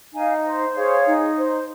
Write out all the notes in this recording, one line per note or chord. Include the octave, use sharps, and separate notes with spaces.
D#4 F5 G#5
C5
G#4 C#5 F5
D#4
C5